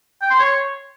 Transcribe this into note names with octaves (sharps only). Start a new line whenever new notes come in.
G5
C6
C#5